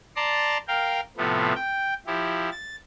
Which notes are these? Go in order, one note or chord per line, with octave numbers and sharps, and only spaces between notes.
D5 A5 A#5 C6
A#4 F5 G5
A2 C3 F3 A3 B3
G5
F3 E4 G4
A6